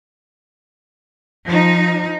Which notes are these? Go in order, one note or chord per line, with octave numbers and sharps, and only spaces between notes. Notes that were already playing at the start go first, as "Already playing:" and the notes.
F3 D#4